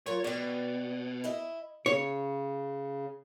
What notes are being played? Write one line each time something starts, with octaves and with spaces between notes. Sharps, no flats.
F#3 F4 A#4 C#5
B2 D5 G5
E4 D#5 E5
C#3 C#5